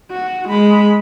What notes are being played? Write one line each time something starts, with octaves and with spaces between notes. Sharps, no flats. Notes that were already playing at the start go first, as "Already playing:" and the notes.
F#4
G#3 B5